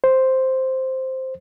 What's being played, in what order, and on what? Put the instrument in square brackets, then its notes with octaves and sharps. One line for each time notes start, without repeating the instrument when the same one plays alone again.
[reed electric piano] C5